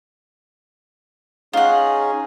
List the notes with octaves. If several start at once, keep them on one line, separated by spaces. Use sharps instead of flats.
C#4 D#4 F4 G#4 F#5